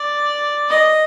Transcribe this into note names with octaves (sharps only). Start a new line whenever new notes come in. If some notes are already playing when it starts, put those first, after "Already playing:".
Already playing: D5
D#5